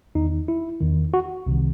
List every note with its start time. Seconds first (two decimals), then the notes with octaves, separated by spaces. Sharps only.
0.15 E2 D#3 D#4
0.48 E4
0.81 E2 D#3
1.14 F#4
1.47 C2 C3 D#3